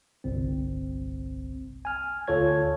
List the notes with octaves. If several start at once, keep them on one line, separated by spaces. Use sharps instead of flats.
G1 C2 C4
G#5 F6
D2 F4 A4 C#5 G#6